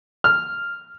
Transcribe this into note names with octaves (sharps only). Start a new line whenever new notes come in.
F6